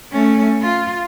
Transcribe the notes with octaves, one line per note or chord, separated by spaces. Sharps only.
A3 C#4
F4